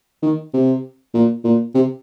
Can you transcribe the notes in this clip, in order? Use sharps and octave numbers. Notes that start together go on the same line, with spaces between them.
D#3
C3
A#2
A#2
C3